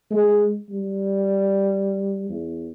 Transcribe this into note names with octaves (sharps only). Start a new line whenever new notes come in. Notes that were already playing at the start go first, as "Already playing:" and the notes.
G#3
G3
E2